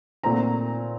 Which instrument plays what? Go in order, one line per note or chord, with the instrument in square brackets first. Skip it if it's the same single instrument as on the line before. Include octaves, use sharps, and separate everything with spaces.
[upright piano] A#2 A3 C4 A#5